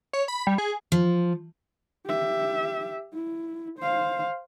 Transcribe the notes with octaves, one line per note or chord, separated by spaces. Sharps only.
C#5
B5
G3
G#4
F3
G4 E5
E4
C5 F5